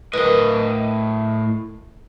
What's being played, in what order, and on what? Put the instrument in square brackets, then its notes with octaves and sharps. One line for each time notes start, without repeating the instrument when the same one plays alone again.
[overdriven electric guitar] A2 D#5 [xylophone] A#4 B4